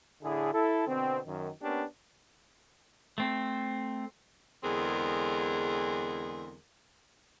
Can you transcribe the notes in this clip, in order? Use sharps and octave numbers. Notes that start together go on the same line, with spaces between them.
A2 D3 E4 G#4
E4 A4
B2 D3 C4
F#2 D#3
A#3 B3 C#4 D4 G4
A3 C4
E2 D3 G#3 C4 G#4 A#4